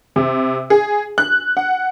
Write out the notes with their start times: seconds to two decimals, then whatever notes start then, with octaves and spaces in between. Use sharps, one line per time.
0.16 C3
0.70 G#4
1.18 F#6
1.57 F#5